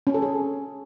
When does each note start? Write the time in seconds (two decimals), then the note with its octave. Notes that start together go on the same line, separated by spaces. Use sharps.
0.07 C#4
0.14 A4
0.22 G#4